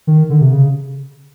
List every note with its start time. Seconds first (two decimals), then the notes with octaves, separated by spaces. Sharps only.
0.07 D#3
0.30 D3
0.42 C3
0.53 C#3